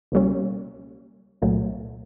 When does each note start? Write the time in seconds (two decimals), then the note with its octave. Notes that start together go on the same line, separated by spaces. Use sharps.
0.12 C#2 B2 G3 A#3 C#4
1.42 C2 A#2 F#3 A3